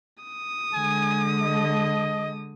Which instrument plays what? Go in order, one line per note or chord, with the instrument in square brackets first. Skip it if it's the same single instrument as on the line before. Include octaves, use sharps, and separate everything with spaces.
[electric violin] D#6
[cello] D3 G#3 [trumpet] G#5
[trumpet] D#5